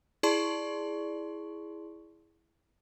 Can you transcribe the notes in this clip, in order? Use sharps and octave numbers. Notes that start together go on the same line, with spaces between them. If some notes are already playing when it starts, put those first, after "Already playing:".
E4 G#4 D5 A5 C6 C#6